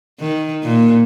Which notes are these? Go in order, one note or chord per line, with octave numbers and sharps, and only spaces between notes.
D#3
A#2